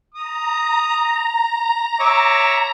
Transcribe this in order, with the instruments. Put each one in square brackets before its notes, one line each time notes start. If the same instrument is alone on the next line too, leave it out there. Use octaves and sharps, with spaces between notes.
[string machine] A#5 [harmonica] D#6
[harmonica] C#5 E5 D6